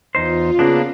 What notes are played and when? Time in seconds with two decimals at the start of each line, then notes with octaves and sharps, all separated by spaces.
0.15 E2 D#4 F4 C5
0.59 C#3 A#3 B3 D4